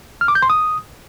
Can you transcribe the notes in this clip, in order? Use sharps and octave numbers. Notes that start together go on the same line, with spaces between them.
F6
D6
G6
C6
D#6